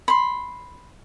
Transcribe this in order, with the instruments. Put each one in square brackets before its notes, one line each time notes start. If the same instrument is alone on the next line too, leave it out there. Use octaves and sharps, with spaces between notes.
[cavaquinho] B5 C6